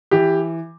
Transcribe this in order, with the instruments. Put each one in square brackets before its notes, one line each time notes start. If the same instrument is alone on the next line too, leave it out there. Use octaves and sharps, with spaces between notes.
[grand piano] E3 [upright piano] G4